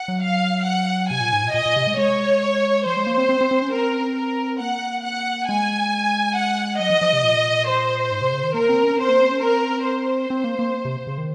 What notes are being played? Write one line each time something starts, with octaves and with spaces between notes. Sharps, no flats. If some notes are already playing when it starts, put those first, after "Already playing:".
Already playing: F#5
F#3
F5
F#5
C3 G#5
A#2
G#2
A#2
A#2 D#5
A#2
C3
G#3
G#3 C#5
F3 C5
G#3
A#3
C4
C4
C4
C4
C#4
C4 A#4
A#4
A#3 F#5
F#5
G#3 G#5
F#5
F#3 D#5
F3
F3
C3
A#2
C5
G#2
C3
C#3
D#3
A#3 A#4
C4
C#4
C4 C5
A#3
C4
C#4
C4 A#4
C5
C4
A#3
A#3
C3
C#3
D#3